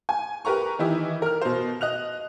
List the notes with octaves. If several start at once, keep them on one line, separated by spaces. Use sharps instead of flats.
G#5
G4 A#4 B4 A#5 C#6
D#3 E3 D#4 E4 G4
A#4 F6
B2 C5
D#5 F#6 F7